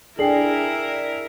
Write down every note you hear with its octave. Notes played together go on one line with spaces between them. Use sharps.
D4 E4 G#4 A#4 G5 C7 F#7